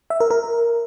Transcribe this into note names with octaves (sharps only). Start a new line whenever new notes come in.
E5
A#4
A#4